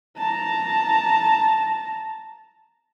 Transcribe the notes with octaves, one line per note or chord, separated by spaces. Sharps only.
A5 A#5